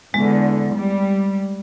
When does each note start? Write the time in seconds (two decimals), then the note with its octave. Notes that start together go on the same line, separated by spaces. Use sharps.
0.14 E2 D3 G#3
0.77 G3